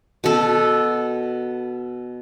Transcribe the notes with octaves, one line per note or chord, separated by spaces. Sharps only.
B2 A4